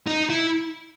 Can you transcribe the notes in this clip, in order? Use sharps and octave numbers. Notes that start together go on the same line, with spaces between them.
D#4
E4